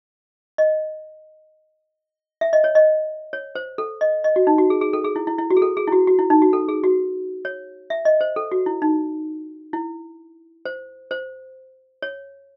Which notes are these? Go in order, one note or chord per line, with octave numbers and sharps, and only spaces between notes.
D#5
E5
D#5
C#5
D#5
C#5
C5
A4
D#5
D#5
F#4
D#4
F#4
G#4
G#4
A4
G#4
E4
E4
E4
F#4
G#4
A4
G#4
E4
F#4
F#4
E4
D#4
F#4
A4
G#4
F#4
C#5
E5
D#5
C5
A4
F#4
E4
D#4
E4
C5
C5
C#5